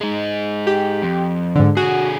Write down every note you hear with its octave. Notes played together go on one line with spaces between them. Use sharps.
G#3 D#4
G4
F2
G#2 D3
D3 F#4 G#4